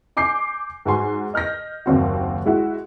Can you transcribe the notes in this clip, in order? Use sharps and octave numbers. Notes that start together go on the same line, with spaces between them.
G#5 D6 G6 C7
G#2 F#4 G#5 C6
D#5 F6 G6 A#6
F#1 D#2 C4 F#4
G#3 E4 F#4